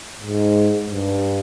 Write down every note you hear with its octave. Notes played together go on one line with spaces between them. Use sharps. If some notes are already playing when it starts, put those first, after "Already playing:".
G#2
G2